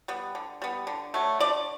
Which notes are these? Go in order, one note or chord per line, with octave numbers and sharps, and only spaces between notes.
G3 B3
D3
G3 B3
D3
F#3 A3
D3 D5